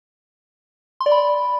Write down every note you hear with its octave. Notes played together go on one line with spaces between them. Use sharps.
C6
D5
B5